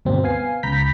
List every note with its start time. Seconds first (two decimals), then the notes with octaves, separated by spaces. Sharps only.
0.05 D2 G2 B2 C4
0.23 B3 F5 G#5 C7
0.63 C#2 A#5 B5 G6 B6